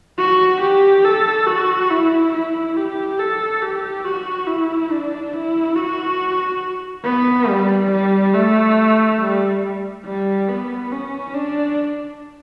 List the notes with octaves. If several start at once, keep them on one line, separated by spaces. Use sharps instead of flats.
F#4
G4
A4
F#4
E4
E4
G4
A4
G4
F#4
E4
D4
E4
F#4
B3
G3
G3
A3
G3
G3
B3
C#4
D4